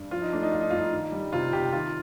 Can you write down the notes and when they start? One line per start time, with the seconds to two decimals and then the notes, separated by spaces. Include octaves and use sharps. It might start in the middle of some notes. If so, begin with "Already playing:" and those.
Already playing: G2
0.11 F3 F4
0.22 D#4
0.33 A3 D4
0.43 D#4
0.52 G2 F4
0.61 D#4
0.70 G2 F4
0.79 D#4
0.92 D#3
1.12 G3
1.33 C3 F4
1.53 C3 G4
1.73 D#3 F4